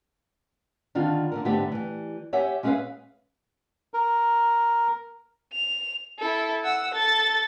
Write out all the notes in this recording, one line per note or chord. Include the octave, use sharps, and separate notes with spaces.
D3 D#3 D4 F4
D3 G#3 A#4
G#2 D3 A3 B3 G4
E3 G3
G4 C#5 E5 F#5 G#5
G#3 C#4 G#4 B4 E5 F5
A#4
F7
E4 A4
F#5 E6
A4 A6